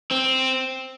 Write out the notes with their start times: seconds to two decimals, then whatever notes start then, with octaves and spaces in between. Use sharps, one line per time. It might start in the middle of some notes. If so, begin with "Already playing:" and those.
0.12 C4